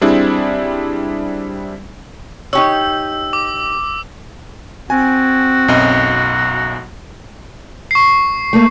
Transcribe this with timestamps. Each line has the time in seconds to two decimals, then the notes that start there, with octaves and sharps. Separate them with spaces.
0.01 G3 C4 D4 E4 G#4
2.53 D#4 G4 C#5 E6
3.33 D6
4.90 C4 F#4 G#5
5.68 B1 F#2 D#5
7.91 C#6 C7
8.53 A3 A#3